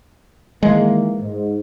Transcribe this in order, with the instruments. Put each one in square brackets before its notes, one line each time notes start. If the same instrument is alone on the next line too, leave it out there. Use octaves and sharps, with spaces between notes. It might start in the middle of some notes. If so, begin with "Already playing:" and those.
[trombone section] D#3 E3 A#3 [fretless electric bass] G#3
[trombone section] G#2